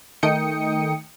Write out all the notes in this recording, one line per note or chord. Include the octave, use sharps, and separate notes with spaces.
D#3 A3 D#4 G5 D#6 C#7